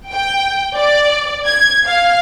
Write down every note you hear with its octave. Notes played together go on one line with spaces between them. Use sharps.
G5
D5
G#6
F5